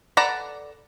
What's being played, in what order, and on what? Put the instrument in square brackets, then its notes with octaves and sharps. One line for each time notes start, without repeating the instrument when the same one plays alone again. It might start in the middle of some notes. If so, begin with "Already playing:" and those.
[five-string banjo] A4 B4 D5 F#5 A#5